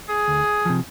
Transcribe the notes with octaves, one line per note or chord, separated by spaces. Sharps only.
G#4
D2
C3 F3